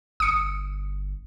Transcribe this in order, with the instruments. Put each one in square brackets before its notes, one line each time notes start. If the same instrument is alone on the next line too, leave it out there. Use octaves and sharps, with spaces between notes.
[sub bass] G1 [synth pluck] D#6 C#7